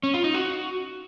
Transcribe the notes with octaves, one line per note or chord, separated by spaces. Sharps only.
C#4
F4
D#4
F#4